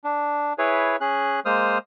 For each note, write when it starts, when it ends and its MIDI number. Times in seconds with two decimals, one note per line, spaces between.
0.04 0.53 62
0.58 0.96 64
0.58 0.96 68
0.58 0.96 71
0.58 0.96 73
1.01 1.40 61
1.01 1.40 68
1.01 1.40 90
1.45 1.78 56
1.45 1.78 58
1.45 1.78 72
1.45 1.78 87
1.45 1.78 89